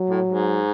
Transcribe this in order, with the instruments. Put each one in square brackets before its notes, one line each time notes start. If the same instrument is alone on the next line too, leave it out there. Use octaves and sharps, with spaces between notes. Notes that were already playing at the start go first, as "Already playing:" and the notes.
Already playing: [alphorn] F#3
[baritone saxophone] A2
G#2